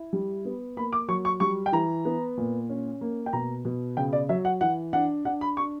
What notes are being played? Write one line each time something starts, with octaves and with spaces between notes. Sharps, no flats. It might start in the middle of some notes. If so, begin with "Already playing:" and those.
Already playing: E4
G3
B3
A#3 B5
D6
F#3 C#6
C#6
G3 C#6
G5
E3 A#5
B3
A#2
C#4
A#3
G5
B2 A#5
B2
C#3 G5
D5
F#3 E5
F#5
E3 F#5
D4 F#5
D4 F#5
B5
D4 C#6